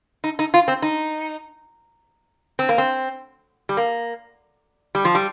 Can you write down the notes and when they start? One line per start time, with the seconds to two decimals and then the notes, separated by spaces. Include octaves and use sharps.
0.24 D#4
0.39 D#4
0.54 F4
0.68 C4
0.82 D#4
2.59 C4
2.69 A#3
2.78 C4
3.69 G3
3.77 A#3
4.95 G3
5.05 F3
5.15 G3